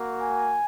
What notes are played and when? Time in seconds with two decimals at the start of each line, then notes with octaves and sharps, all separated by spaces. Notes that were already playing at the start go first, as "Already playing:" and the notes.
Already playing: A#3 F#4
0.20 G#5